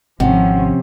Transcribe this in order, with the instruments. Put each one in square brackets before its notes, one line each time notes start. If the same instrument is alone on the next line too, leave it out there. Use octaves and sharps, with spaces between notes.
[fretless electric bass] G#1 [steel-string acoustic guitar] C3 [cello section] F3 C#4 [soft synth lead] F#5